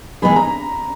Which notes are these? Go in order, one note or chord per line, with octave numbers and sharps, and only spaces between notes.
E3 G#3 B3 D#4 G#4 B5
A#5